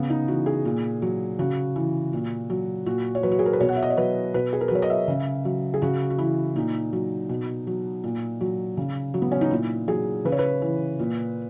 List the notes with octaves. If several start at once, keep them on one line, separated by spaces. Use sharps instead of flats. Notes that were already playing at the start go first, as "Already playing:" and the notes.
Already playing: C#3 B3
D#4
E3 F#4
G#4
A#2
F#3
C#3 F#4
E3
A#2
F#3
A#2 F#4
C#5
F#3 B4
F#4
G#4
A#4
B4
B2 C#5
F#5
E5
D#5
C#5
F#3 B4
B2 B4
G#4
A#4
B4
F#3 C#5
D#5
E5
C#3
F#3
G#4
C#3 F#4
F#4
E3 E4
A#2 D#4
F#3
B2
F#3
A#2
F#3
C#3
F#3
B3
C#4
D#4
A#2 E4
F#3 G#4
C#3 B4
C#5
B4
E3
A#2